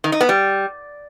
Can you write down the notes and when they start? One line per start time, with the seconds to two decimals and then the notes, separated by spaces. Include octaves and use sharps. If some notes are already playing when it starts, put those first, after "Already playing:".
0.04 D#3
0.12 D#4
0.21 B3
0.29 G3